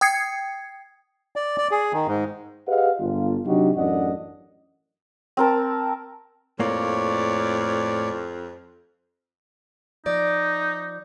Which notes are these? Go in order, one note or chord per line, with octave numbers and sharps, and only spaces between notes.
G5 D#6 G#6 C7 C#7
D5
D5
G#4
D#3
G#2
G4 G#4 B4 D#5 F5 F#5
G1 F4
C3 F#3 D4 D#4 F#4 G4
A1 F#2 C#4 D4 D#5 F#5
C4 A#4 A5
F2 A2 A#3 C#5 D5
F3 D#4 D5